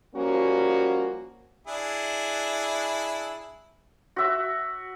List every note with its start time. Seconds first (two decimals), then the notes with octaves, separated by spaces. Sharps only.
0.15 F3 G3 A#3 C#4 F#4
1.67 D4 E4 G#4
4.16 F#4 E5